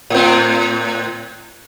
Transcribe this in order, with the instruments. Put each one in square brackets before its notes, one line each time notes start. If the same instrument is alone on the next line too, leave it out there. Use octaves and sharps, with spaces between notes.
[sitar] A2 C4